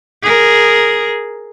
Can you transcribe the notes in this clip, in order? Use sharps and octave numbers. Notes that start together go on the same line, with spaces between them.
G#4 A#4